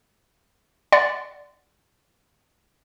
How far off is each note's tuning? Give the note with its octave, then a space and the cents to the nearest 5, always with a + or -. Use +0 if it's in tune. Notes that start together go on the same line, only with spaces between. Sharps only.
D5 +0 F#5 +0 C6 -30